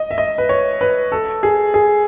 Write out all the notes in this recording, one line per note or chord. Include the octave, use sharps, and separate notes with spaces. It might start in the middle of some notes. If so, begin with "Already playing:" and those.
Already playing: D#5
E5
D#5
B4
C#5
B4
A4
G#4
G#4